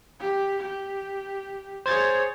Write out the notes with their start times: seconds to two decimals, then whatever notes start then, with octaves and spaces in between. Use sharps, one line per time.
0.20 G4
0.60 G4
1.86 G#4 C5 C#5 G#6 A6